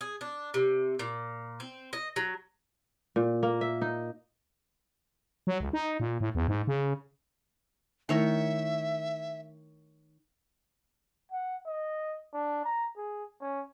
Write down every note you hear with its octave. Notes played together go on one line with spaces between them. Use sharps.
G#4
D4
C3
A#2
C4
D#5
F#3
A#2
A#3
E5
D#4
F#3
C#2
D#4
A#2
A2
E2
G#2
C#3
D#3 A3 E4 A#4 C#5 E5
F#5
D#5
D4
A#5
G#4
C#4